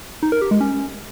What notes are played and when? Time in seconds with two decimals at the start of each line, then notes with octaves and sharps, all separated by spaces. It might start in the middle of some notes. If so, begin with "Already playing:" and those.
0.23 D#4
0.32 A#4
0.42 G4
0.51 G#3
0.61 C#4